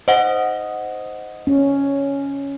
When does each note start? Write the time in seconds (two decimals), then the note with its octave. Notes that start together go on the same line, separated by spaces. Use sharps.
0.08 C5 D#5 F#5
1.47 C#4